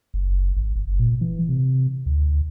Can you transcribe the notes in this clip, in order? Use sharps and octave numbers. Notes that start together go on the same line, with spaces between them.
F#1
G#1
F#1
A#2
E3
C3
D2